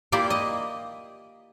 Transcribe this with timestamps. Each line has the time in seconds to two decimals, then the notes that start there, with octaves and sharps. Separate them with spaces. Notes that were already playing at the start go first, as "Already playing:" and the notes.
0.12 A#3 E4 F4 G4 D5 E5
0.30 D#5